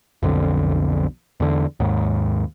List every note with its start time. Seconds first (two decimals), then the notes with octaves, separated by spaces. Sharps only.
0.23 B1 F2 D3
1.40 E2 D3
1.80 D#2 G#2